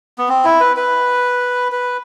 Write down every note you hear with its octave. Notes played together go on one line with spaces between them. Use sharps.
B3
C4
E4
B4
B4
B4